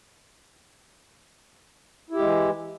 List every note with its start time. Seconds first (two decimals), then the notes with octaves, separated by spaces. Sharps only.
2.10 E4
2.15 G4
2.19 G#3
2.23 E3